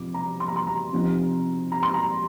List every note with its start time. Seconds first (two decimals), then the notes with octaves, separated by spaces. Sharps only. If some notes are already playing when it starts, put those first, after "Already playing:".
Already playing: C3 F3 D6
0.14 A#5
0.40 C6
0.48 A#5
0.56 C6
0.67 A#5
0.93 C3 F3 C4 D#4
1.72 A#5
1.83 C6
1.94 A#5